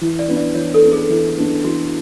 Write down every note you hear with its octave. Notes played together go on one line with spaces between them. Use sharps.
E3
D5
B3 D4
D5
E3 C#5
A4
B3 D4
G#4
E3
B3 D4
E4
E3 F#4